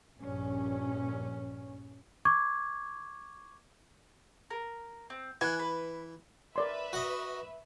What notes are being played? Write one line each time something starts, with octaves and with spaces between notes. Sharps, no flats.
A#1 G2 C#4
C#6 D6 G#6
A#4
C4
E3 G#5 F#6
B4
A#4 B4 D5 E5 C6
F#4 D#5